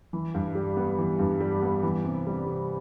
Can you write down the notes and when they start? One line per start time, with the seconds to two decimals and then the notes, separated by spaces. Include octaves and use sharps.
0.13 E3
0.34 G2
0.55 G3
0.77 B3
0.98 E3
1.19 G2
1.40 G3
1.62 B3
1.83 E3
2.04 C3
2.27 G3
2.47 C3